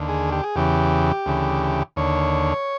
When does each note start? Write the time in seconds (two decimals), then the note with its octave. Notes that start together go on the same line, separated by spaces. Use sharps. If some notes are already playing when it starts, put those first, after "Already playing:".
Already playing: D#2 D3
0.09 G#4
0.32 G4
0.43 G#4
0.55 E2 C#3 E3 G4
1.26 D2 C#3 E3
1.96 D#2 D3 C#5